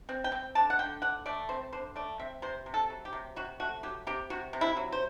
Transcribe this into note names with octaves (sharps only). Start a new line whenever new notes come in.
C4
G5
C4
D3 A5
F#5
D3 G5
D3 F#5
A3 D5
C4 C5
D3 C5
A3 D5
C4 E5
C3 C5
C3
A4
F#3
G4
C3
C3 F#4
A3 F#4
F#3 G4
C3 G4
C3 F#4
C3
E4
F#3
C5